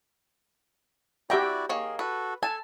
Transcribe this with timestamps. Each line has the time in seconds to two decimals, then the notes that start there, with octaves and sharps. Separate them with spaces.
1.30 E4 F#4 G4 D5 E5 F#5 G5 A#5
1.69 D#3 A#3 G#4 C#5
1.99 F#4 A4 B4
2.43 A4 G#5 A5